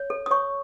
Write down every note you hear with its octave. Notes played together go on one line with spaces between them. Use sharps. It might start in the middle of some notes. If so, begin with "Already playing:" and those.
Already playing: C#5
A4
D#6
C#5 C#6